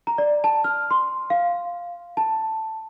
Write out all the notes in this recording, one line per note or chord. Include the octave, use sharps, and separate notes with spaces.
A#5
D5
A5
F6
C6
F5
A5